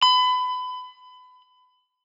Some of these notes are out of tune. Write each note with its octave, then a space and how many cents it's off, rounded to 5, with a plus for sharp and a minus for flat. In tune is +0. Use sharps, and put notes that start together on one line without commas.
B5 +30